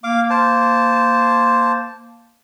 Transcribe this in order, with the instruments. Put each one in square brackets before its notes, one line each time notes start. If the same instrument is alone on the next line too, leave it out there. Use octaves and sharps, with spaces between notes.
[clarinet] A#3 [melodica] F5 D6
[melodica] C5 A5